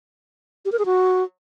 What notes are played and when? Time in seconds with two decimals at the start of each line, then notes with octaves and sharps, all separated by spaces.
0.65 G4
0.72 A#4
0.79 G#4
0.86 F#4